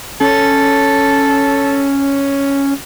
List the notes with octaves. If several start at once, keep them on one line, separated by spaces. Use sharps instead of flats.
C#4 A4